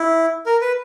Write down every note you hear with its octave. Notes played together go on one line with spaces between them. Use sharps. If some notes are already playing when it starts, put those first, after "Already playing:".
Already playing: E4
A#4
B4